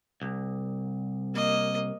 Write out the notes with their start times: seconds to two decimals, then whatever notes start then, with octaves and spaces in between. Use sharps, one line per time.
0.22 C2
1.34 A#3 D#5